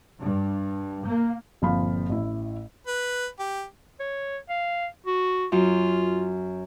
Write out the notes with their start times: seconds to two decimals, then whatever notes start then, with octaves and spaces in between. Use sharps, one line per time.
0.21 G2
1.07 A#3
1.62 G1 A#2 F3 C4 F5 B5
2.09 A1 E4
2.87 B4
3.39 G4
4.00 C#5
4.49 F5
5.06 F#4
5.52 F#2 F#3 F4